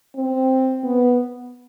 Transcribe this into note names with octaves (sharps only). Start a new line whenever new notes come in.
C4
B3